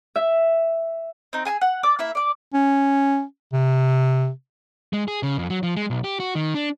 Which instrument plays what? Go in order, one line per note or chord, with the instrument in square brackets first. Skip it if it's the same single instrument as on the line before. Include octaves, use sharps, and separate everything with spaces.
[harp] E5
[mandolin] C4 D#4
G#4 G#5 A5 E6
F#5
D5 D6 E6
A#3 E4 E5
D5 D6
[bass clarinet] C#4
C3
[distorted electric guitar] G#3
G#4
C#3
F2
F#3
F3
G#3
B1
G4
F#4
D#3
D4